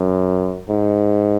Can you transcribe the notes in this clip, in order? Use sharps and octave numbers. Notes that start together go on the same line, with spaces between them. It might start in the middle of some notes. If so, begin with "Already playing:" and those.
Already playing: F#2
G#2